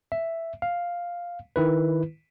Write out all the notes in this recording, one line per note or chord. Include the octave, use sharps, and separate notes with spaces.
E5
F5
D#3 E4 B4